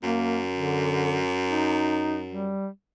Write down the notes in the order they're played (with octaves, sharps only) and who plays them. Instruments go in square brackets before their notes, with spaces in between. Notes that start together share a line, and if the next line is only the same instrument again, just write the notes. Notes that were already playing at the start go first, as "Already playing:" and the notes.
[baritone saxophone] F#2 [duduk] A#3
[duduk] D3
D#4
G3